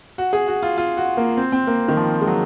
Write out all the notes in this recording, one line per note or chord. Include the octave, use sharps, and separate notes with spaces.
F#4
G#4
F#4
F4
F4
F#4
A#3
C4
C4
A#3
D#3
F3
G#3
F#3